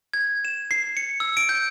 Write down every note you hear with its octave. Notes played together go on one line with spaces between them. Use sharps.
G#6
E7
C7
C#7
E6
D7
G6